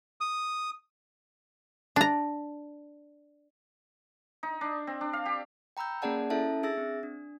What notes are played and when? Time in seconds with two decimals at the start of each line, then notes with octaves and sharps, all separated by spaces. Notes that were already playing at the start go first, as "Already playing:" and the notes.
0.21 D#6
1.96 D4 A#5
4.43 D#4
4.61 D4
4.87 C4
5.01 D4
5.13 F5
5.26 G4
5.77 G5 A#5 B5 E6 G6
6.02 A#3 C#4 G#4 D5 F#5 A5
6.30 C#4 E4 A4 E5 A5
6.63 D4 G#4 E5 E6 A6 A#6
6.77 C4
7.03 D4